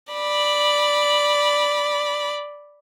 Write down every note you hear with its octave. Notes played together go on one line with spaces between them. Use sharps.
D5 B5